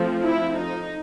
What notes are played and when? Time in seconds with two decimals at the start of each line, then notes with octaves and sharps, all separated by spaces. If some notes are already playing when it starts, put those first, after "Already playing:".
Already playing: F3 A3 C4
0.23 E4
0.57 D#4